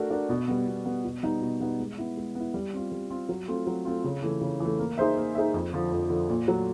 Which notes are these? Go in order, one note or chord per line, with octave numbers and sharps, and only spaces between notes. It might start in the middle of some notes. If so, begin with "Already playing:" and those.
Already playing: A3 D4 F#4 A#4
D4 F#4 A#4
B2
G3 B3
B2
G3 B3
B2
G3 B3 D#4
B2
G3 B3 D#4
G#3
B3 E4
G#3
B3 E4
G3
C4 F4
G3
C4 F4
F#3
A3 C4 F4
F#3
A3 C4 F4
C#3
E3 A3
C#3
E3 A3
A#3
D#4 G#4 C5 E5
A#3
D#4 G#4 C5 E5
F2
D3 F3
F2
D3 F3
A#2
F#3 A3